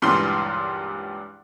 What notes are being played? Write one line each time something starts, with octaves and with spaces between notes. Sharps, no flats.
C#2 G2 A#2 E3 C6